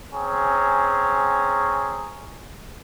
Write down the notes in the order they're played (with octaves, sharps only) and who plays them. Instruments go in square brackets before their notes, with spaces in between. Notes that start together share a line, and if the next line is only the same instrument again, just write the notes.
[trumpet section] C4 C#4 G#4 A#5